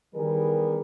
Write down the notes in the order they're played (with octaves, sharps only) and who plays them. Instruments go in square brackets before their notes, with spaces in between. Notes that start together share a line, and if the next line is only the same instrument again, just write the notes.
[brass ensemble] D#3 E3 G3 B3 G#4 A#4